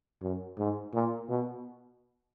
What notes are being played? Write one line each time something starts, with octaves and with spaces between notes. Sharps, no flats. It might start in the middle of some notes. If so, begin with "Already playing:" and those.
F#2
G#2
A#2
B2